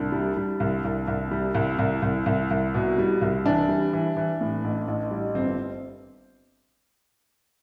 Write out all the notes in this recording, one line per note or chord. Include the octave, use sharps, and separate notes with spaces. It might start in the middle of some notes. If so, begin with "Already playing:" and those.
Already playing: C2 D4
G3
G3
C2
C2
C2
G3
C2
C2
C2
C2
C2
B2
G3
C2
E3 D4
G3
E3
E3
A2
A1
A1
G3
G1 C4